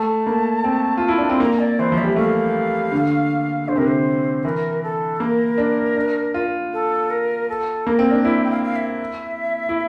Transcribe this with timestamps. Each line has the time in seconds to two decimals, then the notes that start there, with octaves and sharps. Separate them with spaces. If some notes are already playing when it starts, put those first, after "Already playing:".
Already playing: A3 A5
0.27 A#3
0.64 C4
0.97 F4
1.08 E4
1.18 D4
1.30 C4 C6
1.40 A#3 A#5
1.59 D5
1.79 E3 C5
1.92 F3
1.97 E5
2.04 G3
2.16 A3 F5
2.92 D3
3.68 D3 C5
3.76 C3 A#4
3.82 D3 C5
4.44 E3 A#4
4.83 A4
5.20 A#3 A#4
5.58 D4
5.96 D4
6.34 F4
6.72 A4
7.10 A#4
7.49 A4
7.86 A#3 A#4
7.99 C4
8.11 D4
8.24 E4 E5
8.44 G5
8.50 F5
8.63 F5
8.75 E5
9.69 E4